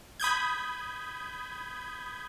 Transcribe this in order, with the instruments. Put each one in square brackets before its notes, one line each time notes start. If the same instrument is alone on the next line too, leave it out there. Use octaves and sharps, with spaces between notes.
[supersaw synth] B5 D#6 G6 G#6